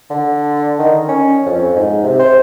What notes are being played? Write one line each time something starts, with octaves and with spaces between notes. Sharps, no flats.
D3
D#3
C#4
F2
G#2
C3
C5